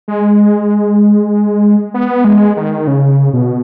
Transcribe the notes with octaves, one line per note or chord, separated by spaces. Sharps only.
G#3
B3
G#3
D#3
C#3
B2